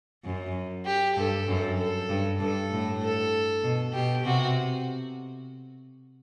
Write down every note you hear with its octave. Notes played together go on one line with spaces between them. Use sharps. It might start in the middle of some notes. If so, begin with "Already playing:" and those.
F#2
G4
G2 A4
F#2
A4
G2
G2 A4
A2
A4
B2
B2 G4
C3 F#4